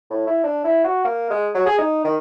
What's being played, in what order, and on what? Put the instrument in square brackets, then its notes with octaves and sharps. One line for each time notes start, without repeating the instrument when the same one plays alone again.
[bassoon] A2
E4
D4
E4
F#4
A#3
G#3
F#3
G#4
D#4
D#3